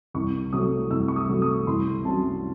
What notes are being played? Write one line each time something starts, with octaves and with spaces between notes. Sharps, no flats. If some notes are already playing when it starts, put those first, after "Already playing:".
C2 C#6
C3 F#3 A3 D#6
C2 E6
C#6
D#6
C3 F#3 A3
D#6
C2 C6
C3 F#3 C#4 A5